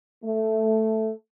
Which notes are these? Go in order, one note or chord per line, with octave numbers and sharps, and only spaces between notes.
A3